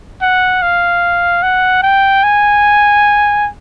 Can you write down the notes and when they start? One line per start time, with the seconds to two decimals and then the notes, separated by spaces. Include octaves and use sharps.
0.22 F#5
0.62 F5
1.43 F#5
1.83 G5
2.23 G#5